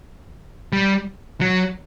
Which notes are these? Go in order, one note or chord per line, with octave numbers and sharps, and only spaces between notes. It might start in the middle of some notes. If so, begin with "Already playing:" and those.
G3
F#3